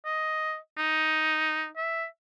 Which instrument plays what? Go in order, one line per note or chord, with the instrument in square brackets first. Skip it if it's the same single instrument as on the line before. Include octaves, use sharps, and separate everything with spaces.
[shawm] D#5
D#4
E5